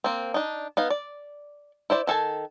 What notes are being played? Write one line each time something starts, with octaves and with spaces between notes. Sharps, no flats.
A#3 C4
D4 D#4
B3 D#4 F5
D5
E4 C5 D5
D#3 A4 G#5 A5